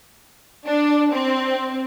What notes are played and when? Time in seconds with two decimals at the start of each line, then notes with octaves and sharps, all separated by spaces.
0.67 D4
1.11 C4